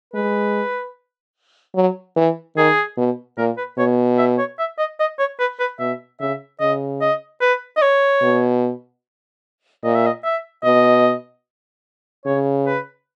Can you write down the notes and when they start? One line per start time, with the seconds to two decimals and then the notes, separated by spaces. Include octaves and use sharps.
0.14 G#3 B4
1.75 F#3
2.16 E3
2.57 D#3 G#4
2.98 B2
3.38 A#2 A#4
3.57 B4
3.78 B2 C#5
4.18 E5
4.38 C#5
4.59 E5
4.78 D#5
5.00 D#5
5.19 C#5
5.40 B4
5.59 B4
5.80 B2 E5
6.20 C#3 E5
6.60 C#3 D#5
7.01 D#5
7.41 B4
7.77 D#5
7.82 C#5
8.22 B2
9.84 A#2 D#5
9.94 E5
10.06 D#5
10.24 E5
10.64 B2 D#5
12.26 C#3 C#5
12.66 B4